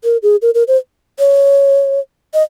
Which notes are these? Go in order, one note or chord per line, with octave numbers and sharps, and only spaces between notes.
A#4
G#4
A#4
A#4
C5
C#5
D#5